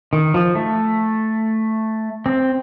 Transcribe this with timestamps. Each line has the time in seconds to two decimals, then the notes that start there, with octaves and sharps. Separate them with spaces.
0.13 D#3
0.34 F3
0.55 A3
2.26 C4